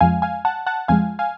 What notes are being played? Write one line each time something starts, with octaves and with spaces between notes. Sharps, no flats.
F2 F3 G#3 F5 G#5
F5 G#5
F#5 A5
F#5 A5
F2 F3 G#3 F5 G#5
F5 G#5